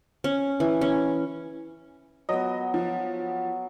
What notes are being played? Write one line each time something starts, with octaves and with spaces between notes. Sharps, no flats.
C#4
E3
C#4
F#3 B3 D#5
F3